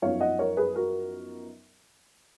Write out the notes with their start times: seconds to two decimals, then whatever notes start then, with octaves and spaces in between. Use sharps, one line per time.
0.02 F#2 F3 B3 D#4 C#5 F5
0.20 D#5 F#5
0.39 A#4 C#5
0.57 G#4 B4
0.75 F#4 A#4